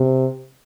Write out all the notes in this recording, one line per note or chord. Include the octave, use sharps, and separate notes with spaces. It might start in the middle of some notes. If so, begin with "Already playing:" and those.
Already playing: C3